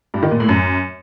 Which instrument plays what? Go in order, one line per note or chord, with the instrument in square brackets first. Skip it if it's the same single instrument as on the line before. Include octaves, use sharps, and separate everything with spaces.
[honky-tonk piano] G2
D#3
A#2
A2
F#2